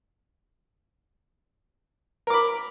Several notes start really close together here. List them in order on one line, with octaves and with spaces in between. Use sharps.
A#4 D6 B5